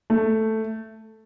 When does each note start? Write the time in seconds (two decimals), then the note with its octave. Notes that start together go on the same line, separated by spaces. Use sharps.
0.10 A3